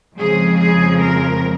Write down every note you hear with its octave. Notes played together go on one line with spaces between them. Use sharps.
F2 C#3 F3 G#3 C4 G#4
G#4
A#4